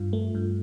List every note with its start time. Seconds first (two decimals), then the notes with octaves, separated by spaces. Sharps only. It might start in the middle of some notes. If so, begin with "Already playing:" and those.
Already playing: G2 F4
0.13 A3
0.35 G2